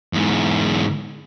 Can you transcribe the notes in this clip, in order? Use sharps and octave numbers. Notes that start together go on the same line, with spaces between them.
E2 G#2